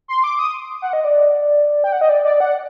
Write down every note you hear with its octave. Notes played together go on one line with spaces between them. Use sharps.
C6
D6
D#6
F#5
D#5
D5
G5
F#5
D#5
D5
D5
F#5